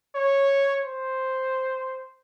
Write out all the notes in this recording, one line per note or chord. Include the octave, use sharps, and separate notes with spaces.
C#5
C5